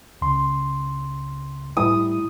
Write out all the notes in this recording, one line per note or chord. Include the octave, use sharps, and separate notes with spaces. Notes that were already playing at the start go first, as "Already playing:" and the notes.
C#2 C#3 C6
A2 G3 E4 D#6